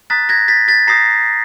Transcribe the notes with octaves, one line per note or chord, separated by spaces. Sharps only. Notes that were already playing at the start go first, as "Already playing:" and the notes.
A#5 D#6 F#6 A6 B6
G#6 A#6
A6 B6
A6 B6
A#5 D#6 G6 A#6 C7